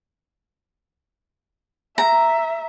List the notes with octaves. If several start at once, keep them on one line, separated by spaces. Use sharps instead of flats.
E5 A#5